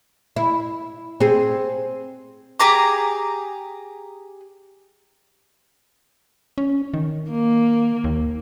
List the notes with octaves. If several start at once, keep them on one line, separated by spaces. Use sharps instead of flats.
E4
C4 G#4
G4 G#4 A#5 D6
C#4
D#3
A#3
D#2